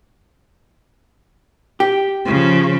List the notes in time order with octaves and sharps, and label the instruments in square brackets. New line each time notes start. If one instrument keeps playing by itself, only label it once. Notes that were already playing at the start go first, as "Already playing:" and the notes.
[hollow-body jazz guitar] G4
[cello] C#3 F3